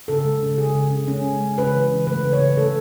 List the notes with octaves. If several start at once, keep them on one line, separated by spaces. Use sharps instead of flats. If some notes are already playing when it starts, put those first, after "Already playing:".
C#3 A4
G#3
C#3
C#3 G#4
C#3
C#3
G#3 C#4
G#3
G#3
C#3 B4
E3
C#3
A3 B4
C#3
C#5
C#3
A3 A4